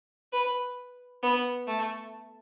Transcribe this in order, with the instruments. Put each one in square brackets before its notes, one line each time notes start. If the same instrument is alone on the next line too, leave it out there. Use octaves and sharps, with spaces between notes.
[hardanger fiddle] B4
B3
A3